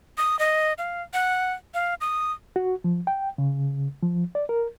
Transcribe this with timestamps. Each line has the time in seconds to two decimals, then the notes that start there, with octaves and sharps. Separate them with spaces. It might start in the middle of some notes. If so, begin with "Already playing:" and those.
0.18 D#6
0.39 D#5
0.78 F5
1.13 F#5
1.74 F5
2.01 D#6
2.56 F#4
2.84 F3
3.07 G5
3.38 C#3
4.03 F3
4.35 D5
4.49 A#4